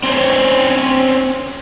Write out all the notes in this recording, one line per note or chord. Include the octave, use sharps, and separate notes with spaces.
C4 C#4 C5 C#5